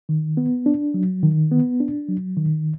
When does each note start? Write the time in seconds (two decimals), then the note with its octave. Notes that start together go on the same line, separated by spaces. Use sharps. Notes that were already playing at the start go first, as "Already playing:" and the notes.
0.09 D#3
0.37 B3
0.66 D4
0.94 F#3
1.23 D#3
1.51 B3
1.80 D4
2.08 F#3
2.37 D#3